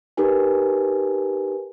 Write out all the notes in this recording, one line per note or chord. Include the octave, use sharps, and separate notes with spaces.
D#4 G4 A#4 B4 G#5